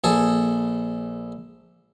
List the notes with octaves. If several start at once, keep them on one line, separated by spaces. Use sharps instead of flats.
A#1 G#4 A4